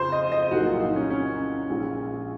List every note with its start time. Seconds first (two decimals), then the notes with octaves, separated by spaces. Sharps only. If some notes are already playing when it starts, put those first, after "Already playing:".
Already playing: F2 C#3 C5
0.12 D#5
0.32 D#5
0.51 C2 A#2 F#3 A#3 F#4
0.66 F4
0.81 D#4
0.96 C#4
1.10 C#4
1.69 A#1 A#2 G#3